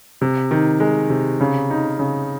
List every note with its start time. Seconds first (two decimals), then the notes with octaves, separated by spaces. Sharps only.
0.21 C3
0.51 D#3
0.80 G#3
1.10 C3
1.41 C#3
1.70 D#4
1.99 C#3